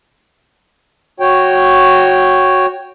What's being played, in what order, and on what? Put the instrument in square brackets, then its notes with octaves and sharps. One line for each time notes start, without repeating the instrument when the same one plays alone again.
[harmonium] F#4 C#5 G5